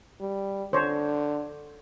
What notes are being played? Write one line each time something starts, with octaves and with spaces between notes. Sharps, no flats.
G3
D3 C5 C#5